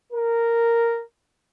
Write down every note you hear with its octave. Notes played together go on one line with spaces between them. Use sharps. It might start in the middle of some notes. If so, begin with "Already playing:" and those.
A#4